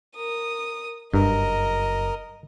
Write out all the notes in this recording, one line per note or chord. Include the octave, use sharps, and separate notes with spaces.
A#4 D#6
F#1 G2 A#4 D#5